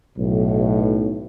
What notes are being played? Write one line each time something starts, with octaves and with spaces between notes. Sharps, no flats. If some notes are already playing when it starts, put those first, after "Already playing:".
B1 A2